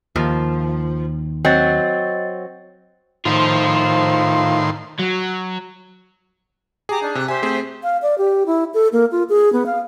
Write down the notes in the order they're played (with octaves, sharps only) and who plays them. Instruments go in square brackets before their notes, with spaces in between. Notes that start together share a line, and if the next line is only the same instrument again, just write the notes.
[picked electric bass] D#2 [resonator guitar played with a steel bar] F3
[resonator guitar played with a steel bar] F#3 C4 [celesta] D#5 A6
[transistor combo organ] A2 D#3 C6 [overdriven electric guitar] F4 C5
[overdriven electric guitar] F#3
[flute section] G4 A#5 D6 [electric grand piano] G#4
[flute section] D4 D#4
[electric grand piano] C3 [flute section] D6 F#6
[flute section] G4 C5 E5 [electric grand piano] G#5
[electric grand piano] A3 C4 G#4
[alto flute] F5
D5
G4
E4
A4
A#3
F4
G#4
B3
F5